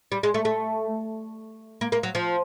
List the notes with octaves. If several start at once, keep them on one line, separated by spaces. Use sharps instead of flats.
G3
G#3
A3
A3
A#3
A#3
F#3
F3